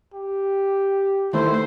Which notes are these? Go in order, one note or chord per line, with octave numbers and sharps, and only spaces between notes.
G4
D#3 A3 E4 C5